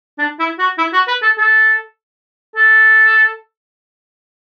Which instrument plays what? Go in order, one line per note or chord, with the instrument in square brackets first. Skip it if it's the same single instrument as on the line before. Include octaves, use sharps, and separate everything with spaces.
[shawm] D4
E4
F#4
E4
F#4
B4
A4
A4
A4